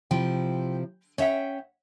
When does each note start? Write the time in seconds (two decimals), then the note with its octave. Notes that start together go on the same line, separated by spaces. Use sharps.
0.11 C3 F3 E4 G5
1.18 C#4 C#5 E5 F#5 G5